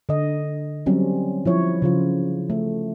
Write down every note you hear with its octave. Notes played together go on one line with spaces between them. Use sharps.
D3 D#5
F#3 G3 C4 C#4
F3 E4 C#5
C#3 F3 F4
A3